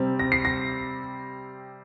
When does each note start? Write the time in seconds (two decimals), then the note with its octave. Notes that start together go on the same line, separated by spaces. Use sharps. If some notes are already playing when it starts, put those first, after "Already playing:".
Already playing: C3 G3 C4
0.19 A#6
0.32 C7
0.45 A#6